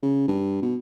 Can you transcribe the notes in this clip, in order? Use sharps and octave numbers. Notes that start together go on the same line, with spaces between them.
C#3
G2
B2